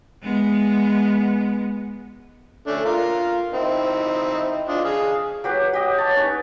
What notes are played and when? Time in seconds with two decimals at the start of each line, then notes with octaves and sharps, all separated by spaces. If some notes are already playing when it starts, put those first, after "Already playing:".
0.22 G#3 B3
2.67 A3 C#4 D4
2.85 F4 A#4
3.53 C4 D#4 E4
4.68 D4 F4 D#5
4.85 G#4 F5
5.44 F#3 G4 B4
5.73 G4 D#5 F#5
5.98 C#5 A5
6.16 C#4 D#4 B4 C#5